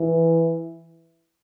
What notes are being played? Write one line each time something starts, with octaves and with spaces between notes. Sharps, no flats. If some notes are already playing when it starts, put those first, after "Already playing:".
Already playing: E3